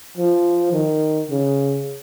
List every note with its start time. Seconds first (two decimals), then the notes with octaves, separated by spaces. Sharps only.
0.17 F3
0.73 D#3
1.30 C#3